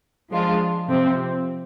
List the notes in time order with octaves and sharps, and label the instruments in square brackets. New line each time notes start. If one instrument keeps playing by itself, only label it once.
[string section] F3 G#3 D4 F4
C3 F3 C4